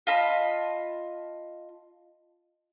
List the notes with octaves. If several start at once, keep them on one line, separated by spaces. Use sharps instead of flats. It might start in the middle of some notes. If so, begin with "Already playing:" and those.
F4 D#5 A5 B5